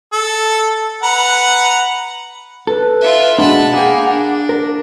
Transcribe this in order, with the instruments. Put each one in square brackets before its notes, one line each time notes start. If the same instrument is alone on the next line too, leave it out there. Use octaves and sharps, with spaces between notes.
[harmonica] A4
B4 F#5 A#5
[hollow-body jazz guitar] A4 [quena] B4
[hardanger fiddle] F4 E5
[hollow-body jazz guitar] B2 G#3 D4 [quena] F#5 [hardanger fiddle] A5 B5
[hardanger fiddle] A#3 G#5 [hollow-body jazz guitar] G#4 G5
[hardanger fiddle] D4
[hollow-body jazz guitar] A#4